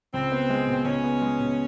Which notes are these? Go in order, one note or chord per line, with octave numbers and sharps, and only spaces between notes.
C#2 C4
B3
G#3
B2
C#2 C#4
B3
G#3
B2